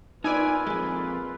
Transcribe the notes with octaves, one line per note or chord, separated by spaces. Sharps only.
A#3 D#4 F4 B4 D5 G#5 B5 E6
F2 G#3